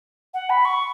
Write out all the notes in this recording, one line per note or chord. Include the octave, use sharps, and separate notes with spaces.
F#5
B5
C#6